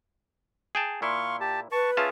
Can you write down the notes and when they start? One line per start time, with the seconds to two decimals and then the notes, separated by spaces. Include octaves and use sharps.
0.75 G#4 G5 A5
1.02 A#2 E4 F5 C6 C#6
1.40 G4 A5
1.72 B4 A5 C#6
1.97 C#4 F4 G#4 E5 A5